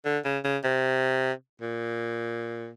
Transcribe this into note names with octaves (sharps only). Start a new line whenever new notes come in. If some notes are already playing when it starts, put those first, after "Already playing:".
D3
C#3
C#3
C3
A#2